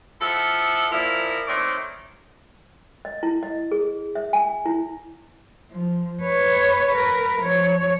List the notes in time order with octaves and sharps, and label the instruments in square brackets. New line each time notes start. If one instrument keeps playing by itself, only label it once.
[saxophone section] F3 E4 A4 E5 F#5
A#2 F3 E4 A#4
D#3 A3 C4 C#5 D5
[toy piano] D#5
E4
D#5
G#4
E5
G#5
E4
[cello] F3
B4 C#5
A#4 B4
F3 C#5